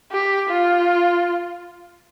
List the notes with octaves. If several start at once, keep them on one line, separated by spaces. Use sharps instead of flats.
G4
F4